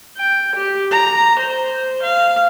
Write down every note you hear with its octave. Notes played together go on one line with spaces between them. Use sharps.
G5
G4
A#5
C5
F5